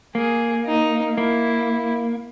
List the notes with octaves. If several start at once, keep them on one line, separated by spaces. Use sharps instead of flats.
A#3 G#4
D#4
A#3 E4